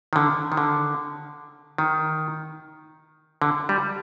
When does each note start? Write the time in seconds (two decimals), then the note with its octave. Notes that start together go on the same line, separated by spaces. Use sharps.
0.13 D#3
0.16 D3
0.52 D#3
0.57 D3
1.78 D#3
3.42 D3
3.69 G3